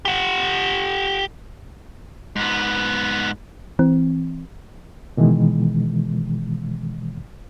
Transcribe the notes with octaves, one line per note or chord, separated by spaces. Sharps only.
G4 F#5
G#2 B3
E3 C4
B2 D#3 E3 G#3